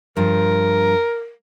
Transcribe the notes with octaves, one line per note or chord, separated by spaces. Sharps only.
G2 F3 A#4